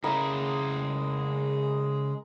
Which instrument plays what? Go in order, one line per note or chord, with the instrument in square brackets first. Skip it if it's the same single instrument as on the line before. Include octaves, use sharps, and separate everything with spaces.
[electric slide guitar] C#3 E4 [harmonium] G#3 G#4 [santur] A#4 D#5